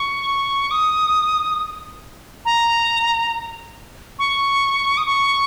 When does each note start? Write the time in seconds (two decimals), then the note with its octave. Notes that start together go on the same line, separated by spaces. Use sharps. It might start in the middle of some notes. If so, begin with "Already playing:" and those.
Already playing: C#6
0.71 D#6
2.45 A#5
4.19 C#6
4.97 D#6
5.06 C#6